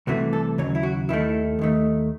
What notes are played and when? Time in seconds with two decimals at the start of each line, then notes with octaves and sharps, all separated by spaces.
0.07 C2 C3 E3 A3 F#4
0.33 A4
0.58 D#2 C#3 F#3 C#5
0.75 E4
0.83 F#4
1.09 D#2 D#3 A3 E4
1.59 D#2 D#3 A3